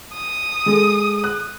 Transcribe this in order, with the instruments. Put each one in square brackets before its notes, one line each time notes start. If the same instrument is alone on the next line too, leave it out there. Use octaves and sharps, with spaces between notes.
[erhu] D#6
[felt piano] G#3 A4
F#6